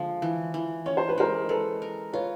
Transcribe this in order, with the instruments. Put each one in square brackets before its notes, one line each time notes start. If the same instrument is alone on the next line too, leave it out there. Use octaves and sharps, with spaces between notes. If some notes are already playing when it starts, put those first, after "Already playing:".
Already playing: [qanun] D3 F3 G#3
E3
E3
[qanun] C#4 [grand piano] C#5
[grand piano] C5
B4
[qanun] G#3 [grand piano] A#4 C5
[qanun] G#3 [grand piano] A4 B4
[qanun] A#4
[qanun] F4 [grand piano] B4 C#5